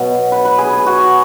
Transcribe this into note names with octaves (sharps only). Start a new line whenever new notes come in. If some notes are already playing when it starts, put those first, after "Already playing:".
Already playing: B2 F#3
B4
B4
G#4
G#4
F#4